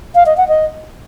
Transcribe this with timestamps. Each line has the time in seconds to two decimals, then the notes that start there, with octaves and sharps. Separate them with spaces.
0.15 F5
0.26 D#5
0.37 F#5
0.48 D#5